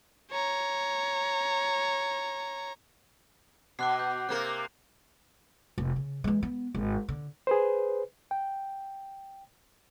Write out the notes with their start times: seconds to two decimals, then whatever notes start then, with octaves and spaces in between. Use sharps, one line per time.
0.31 C#5 A#5
3.79 B2 D6 F#6 C7
3.98 D6 G6
4.29 C3 A#3 A#4 F#6
5.78 F1
5.96 C#3
6.24 E3 G#3
6.43 B3
6.75 G#1
7.09 D3
7.47 G#4 B4 C5
8.31 G5